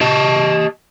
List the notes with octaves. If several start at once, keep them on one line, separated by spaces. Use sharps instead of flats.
G4 D#5 A5